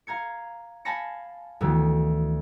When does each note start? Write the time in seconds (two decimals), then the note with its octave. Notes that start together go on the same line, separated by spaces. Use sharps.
0.07 F5 A#5 G#6 C#7
0.85 F5 G#5 A5 B5 A#6 C#7
1.61 D2 B2 D#3 E3